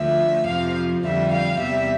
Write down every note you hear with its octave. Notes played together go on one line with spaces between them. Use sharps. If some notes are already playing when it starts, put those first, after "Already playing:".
Already playing: D2 D3 F3 E5
F2 C3 F3 F5
F2 D3 G3 E5
F5
E2 C3 G3 E5